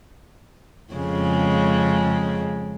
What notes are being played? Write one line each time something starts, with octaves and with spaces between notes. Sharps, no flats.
F2 C#3 G#3